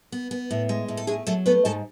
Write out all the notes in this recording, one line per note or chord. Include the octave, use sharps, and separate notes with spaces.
B3
B3
A2
G#3
A2
A4
G#3 A3 G#4
F#3 A3 A4
A3 B3 B4
G#2 A4 A5